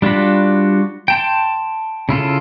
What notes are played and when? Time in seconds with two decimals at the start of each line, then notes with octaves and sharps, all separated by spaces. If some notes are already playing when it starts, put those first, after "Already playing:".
0.02 G3 D4 F4 F#4 B5
1.08 G5 A5 C6
2.09 C#3 E4 F4 A4